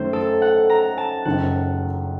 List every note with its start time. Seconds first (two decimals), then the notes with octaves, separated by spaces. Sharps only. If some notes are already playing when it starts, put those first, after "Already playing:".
Already playing: F#2 D#3 A3 C5
0.13 A4
0.42 F#5
0.70 A#5
0.98 A5
1.25 F#1 F#2 D#3 F#5